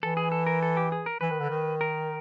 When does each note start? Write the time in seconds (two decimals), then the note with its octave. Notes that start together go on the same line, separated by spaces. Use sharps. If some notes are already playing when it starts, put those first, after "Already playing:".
0.03 E3 A4
0.17 G#4
0.32 A4
0.47 A#4
0.63 A4
0.77 G4
0.92 G#4
1.06 A#4
1.21 E3 B4
1.30 D#3
1.40 D3
1.49 D#3
1.81 A#4